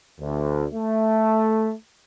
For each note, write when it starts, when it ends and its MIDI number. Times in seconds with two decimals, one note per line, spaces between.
0.20 0.66 38
0.73 1.72 57